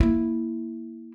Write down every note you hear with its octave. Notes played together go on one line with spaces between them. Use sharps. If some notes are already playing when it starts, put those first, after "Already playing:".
A#3 E4